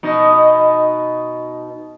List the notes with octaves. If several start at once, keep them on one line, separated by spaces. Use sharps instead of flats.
B2 D#4